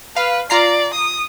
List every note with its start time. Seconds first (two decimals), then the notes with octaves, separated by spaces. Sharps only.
0.16 B4 F5
0.50 F4 D5 A#5 C7
0.94 D#6